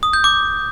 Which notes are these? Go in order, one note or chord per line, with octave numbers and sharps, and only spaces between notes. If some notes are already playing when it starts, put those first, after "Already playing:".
D#6
G6
D6